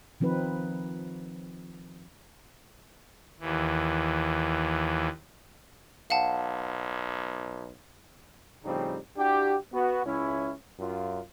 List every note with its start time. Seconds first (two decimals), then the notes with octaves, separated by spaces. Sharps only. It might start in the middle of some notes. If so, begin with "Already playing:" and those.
0.20 D#3 F3 C4 D#4 B4
3.40 D#2 E3
6.10 B1 F5 F#5 A5
8.65 A2 C#3 F3 G3 C4 D#4
9.17 D4 E4 F#4 G4
9.73 B3 F#4
10.05 C#2 C#4 E4
10.79 F#2 F4